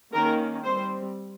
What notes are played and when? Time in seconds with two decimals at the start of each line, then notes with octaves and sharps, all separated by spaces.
0.13 D#3 A#3 C#4 A#4
0.63 G3 C4 C5